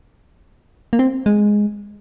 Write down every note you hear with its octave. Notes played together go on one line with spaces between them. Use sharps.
A#3
C4
G#3